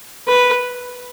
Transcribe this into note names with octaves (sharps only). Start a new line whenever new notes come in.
B4